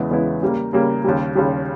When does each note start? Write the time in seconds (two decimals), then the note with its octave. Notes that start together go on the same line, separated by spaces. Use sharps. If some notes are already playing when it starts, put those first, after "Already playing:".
Already playing: E2 C#3 G#3 B3 E4
0.11 E2 C#3 G#3 B3 E4
0.42 C#3 G3 A#3
0.73 C#3 G3 A#3
1.04 D#2 C#3 G3
1.35 D#2 C#3 G3